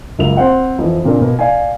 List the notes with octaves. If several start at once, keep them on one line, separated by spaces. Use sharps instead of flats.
C#2 F#2 A#3 F7
C4 C5 F#5
F2 E3
A#2 C#3 C4 D4 A#4
B2 A#3
D5 F5 G5 G#5